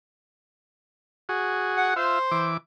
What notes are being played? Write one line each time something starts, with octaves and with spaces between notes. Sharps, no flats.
F#4 G#4
F#5
F4 C5 E5
E3 D6